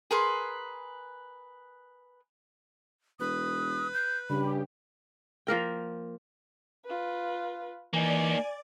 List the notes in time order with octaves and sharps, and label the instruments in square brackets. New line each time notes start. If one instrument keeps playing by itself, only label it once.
[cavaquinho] G#4 A#4 B4 C6
[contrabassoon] E1 [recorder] B4 [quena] D#6
[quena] G6
[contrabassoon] G2 [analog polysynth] C#3 G4 [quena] B5
[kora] F3 A#3 A#4 G5
[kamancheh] F4 B4
[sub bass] E3 [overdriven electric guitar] A#3 D#4 [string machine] D5 [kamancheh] G#5